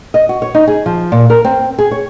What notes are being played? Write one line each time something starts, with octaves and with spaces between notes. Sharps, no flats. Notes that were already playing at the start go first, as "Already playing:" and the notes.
D#5
F#4
C#5
D#4
G#4
F3
A#2
A#4
C4
G#4
C#5